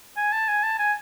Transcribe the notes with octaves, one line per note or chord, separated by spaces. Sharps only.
G#5
A5
G#5
A5
G#5